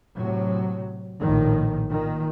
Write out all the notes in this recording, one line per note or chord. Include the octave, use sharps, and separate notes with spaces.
A2 C3 F#3
A#1 A2 D#3
A#2 D#3